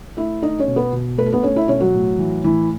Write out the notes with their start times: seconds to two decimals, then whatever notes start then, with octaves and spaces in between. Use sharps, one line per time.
0.17 A3 E4 E5
0.42 A3 D#4 D#5
0.59 C#4 C#5
0.68 B2
0.76 B3 B4
0.93 B2
1.18 A3 B4
1.26 A4
1.33 B3 B4
1.43 A3 C#4 C#5
1.56 E4 E5
1.68 B2 C#4 C#5
1.80 F#3 F#4
1.93 A2
2.18 E3
2.44 A2 E3 E4